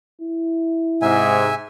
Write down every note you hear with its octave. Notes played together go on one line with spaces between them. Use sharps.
E4
G#2 C3 E5 G#5